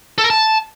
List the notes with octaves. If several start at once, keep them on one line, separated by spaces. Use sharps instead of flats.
A4
A#4
A5